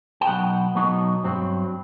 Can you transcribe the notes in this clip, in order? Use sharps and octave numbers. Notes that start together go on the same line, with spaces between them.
G5
B2 F#3 B3 D#4 F#5
B2 F#3 B3 D#4
G2 F#3 C4